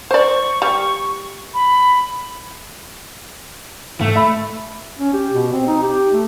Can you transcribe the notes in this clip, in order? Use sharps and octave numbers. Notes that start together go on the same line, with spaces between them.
C5 D5 C#6
G3
B5
G#2 A3
E5 B5
C#4
G4
B2
C4
D#4
G4
A3